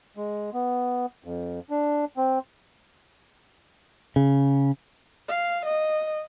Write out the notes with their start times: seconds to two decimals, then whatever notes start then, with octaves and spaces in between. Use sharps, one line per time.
0.17 G#3
0.54 B3
1.24 F2
1.70 D4
2.17 C4
4.16 C#3
5.28 F5
5.65 D#5